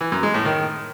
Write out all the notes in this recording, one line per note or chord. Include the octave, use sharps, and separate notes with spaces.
E3
F#2
G#3
A2
D#3